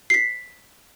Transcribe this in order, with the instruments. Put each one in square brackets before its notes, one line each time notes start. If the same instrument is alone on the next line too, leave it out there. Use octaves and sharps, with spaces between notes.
[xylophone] B6 C7